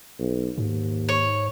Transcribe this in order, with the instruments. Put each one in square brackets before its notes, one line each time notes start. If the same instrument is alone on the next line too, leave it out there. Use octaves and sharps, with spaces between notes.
[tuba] B1
[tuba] D#2 [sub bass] G#2
[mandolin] C#5